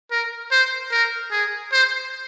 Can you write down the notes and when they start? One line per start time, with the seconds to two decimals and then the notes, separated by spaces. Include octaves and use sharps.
0.11 A#4
0.51 C5
0.91 A#4
1.31 G#4
1.72 C5